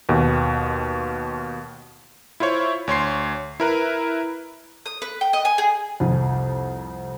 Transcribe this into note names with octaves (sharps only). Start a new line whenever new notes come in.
D#2 B2
E4 F4 C5 C#5 C#6
D2 C#5 C6 C7
E4 A#4 B4
D#6
B4
G5
D#5
G#5
G#4
C2 F2